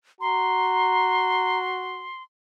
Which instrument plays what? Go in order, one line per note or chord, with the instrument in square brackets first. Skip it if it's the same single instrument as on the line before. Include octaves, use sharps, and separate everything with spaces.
[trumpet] F#4 [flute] A#5 [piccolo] C6